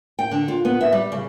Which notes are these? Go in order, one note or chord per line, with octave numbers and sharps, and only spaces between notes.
G5
D3
F4
B3
E5
G3
C#3